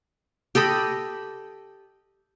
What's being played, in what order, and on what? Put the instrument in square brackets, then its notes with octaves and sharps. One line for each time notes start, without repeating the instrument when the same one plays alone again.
[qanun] G4 A4 D#5 B5